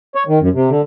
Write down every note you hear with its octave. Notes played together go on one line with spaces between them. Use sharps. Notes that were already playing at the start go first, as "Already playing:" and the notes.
C#5
D#3
F#2
C3
D3